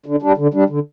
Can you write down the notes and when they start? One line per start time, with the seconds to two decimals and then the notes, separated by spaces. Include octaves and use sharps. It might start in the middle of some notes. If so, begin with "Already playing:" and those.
0.06 D3
0.22 G3 D4
0.37 D3
0.54 G3 D4
0.69 D3